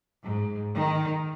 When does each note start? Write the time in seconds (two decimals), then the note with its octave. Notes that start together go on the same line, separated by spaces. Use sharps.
0.26 G#2
0.75 D#3